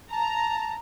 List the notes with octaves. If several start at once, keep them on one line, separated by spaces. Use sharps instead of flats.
A5 A#5